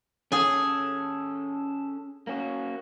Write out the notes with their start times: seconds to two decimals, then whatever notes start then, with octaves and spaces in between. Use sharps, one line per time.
0.32 C#4 G#4 A4 G#5
2.27 A#3 C#4 F#4